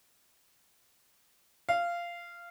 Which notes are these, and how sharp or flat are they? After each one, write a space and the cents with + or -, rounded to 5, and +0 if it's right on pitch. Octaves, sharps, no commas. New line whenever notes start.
F5 -15